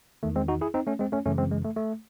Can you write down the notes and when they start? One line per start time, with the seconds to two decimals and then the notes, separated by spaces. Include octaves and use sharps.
0.23 E2 D#3 A3
0.36 G#3 C4
0.48 D#4 F#4
0.61 E4 G#4
0.74 C4 D#4
0.87 A3 C#4
0.99 G#3 C4
1.12 A3 C#4
1.26 F#2 C#3 E3 A3 C#4
1.38 G#3 C4
1.51 G#3
1.65 A3
1.76 A3